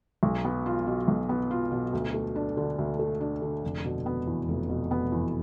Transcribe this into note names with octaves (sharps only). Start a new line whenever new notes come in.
B1
B3
F4
B2
B1
B3
F4
B2
D2
A3
D4
D3
D2
A3
D4
D3
F1
B2
B3
E2
F1
B2
B3
E2